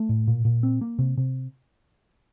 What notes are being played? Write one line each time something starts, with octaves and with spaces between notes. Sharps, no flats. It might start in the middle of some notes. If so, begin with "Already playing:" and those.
Already playing: A3
A2
A#2
A#2
C4
A#3
C3
C3